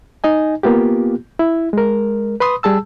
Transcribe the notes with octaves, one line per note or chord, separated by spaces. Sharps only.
D#4 D#5 G#5
A#3 B3 F4 G4
E4
G#3 A#4
B4 B5 C6 D#6
G3 G#4 A5 E6